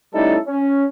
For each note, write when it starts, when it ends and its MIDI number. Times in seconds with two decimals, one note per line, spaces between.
0.14 0.37 55
0.14 0.37 57
0.14 0.37 61
0.14 0.37 63
0.14 0.37 64
0.14 0.37 69
0.47 0.84 61